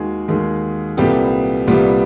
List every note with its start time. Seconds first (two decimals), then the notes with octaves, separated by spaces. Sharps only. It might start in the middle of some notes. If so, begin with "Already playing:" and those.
Already playing: D#2 D#3 G#3 F#4 G#4
0.28 D#2 D#3 G#3
0.97 C2 A#2 G3 B3 G4 A4
1.67 C2 A#2 G3 B3